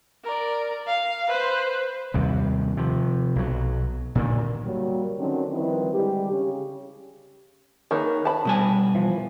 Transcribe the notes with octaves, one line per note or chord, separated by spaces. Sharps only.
A#4 D5
F5
B4 C5
D#2 C3 G3
C3 F3
B1 F#3
A#2 D3 D#3
F#3 G3 A#3
D3 D#3 F#3 C4 C#4
D#3 F3 G3 C4 E4 B4
D3 G3 G#3 G4
C#3 C#4
D#3 A#3 G#4 B4 C#5
A5 B5
B2 G3 G#5
E3 F3